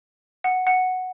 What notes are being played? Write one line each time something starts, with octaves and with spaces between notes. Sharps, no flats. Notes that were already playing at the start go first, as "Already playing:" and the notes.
F#5
F#5